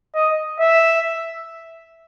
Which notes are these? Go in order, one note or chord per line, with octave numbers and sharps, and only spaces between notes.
D#5
E5